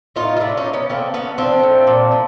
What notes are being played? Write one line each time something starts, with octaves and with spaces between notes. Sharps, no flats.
A2 D#4 F4
F4
F#3 D4 E4
C#4 D#4
A#2
B3 C#4
D3 A#3 C4
D3 B3 C#4
F3 C4 D4
A2
A#2
F3